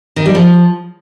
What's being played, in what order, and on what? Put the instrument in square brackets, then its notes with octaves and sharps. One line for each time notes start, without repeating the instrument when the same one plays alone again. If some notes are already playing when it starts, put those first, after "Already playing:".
[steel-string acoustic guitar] D#3
G3
F3